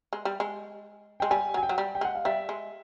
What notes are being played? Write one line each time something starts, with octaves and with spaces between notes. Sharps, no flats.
G#3
G3
G#3
G#3 G5
G3 G#5
F#3 G#5
G5
F#3
G3
G5
G#3 F#5
F5
G3 E5
G#3